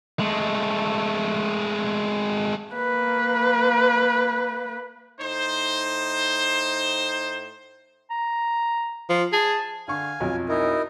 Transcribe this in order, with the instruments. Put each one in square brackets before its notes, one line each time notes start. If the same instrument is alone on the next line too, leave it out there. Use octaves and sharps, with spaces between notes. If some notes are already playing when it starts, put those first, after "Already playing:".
[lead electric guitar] G#3 A3
[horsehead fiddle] A#3 B4
[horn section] A2 D#4 C5
[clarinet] A#5
[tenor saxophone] F3
[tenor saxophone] G#4 [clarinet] A5
[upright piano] D3 C#6 [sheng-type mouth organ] F5 G#5
[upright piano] B1 F2 F3
[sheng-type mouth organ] D#4 E4 A#4